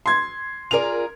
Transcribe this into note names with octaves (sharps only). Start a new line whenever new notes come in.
C6 G#6
F4 G#4 A#4 D5 F7